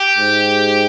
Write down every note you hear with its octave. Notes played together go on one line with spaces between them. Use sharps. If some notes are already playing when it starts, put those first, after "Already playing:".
Already playing: G4
G#2